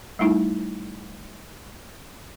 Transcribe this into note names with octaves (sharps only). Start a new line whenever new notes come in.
G3 A3 D#4 E4